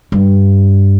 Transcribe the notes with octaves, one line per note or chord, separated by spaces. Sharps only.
G2